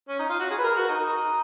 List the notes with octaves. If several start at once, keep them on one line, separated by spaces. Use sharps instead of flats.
C#4
D#4
F4
F#4
G#4
B4
A#4
F#4
D#4